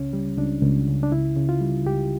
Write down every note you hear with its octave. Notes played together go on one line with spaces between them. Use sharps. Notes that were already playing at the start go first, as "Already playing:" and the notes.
Already playing: C#2 C#3 C#4
G3
C#2 D4
C#2
C#3
D4
C#2 E4
C#3
F4
G3
C#2 G4